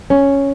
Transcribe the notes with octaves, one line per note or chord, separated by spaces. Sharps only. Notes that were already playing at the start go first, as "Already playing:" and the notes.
C#4